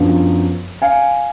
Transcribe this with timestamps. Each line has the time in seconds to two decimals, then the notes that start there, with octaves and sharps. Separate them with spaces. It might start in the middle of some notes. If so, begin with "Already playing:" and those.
Already playing: F#2 F3 B3 D4
0.82 F5 G#5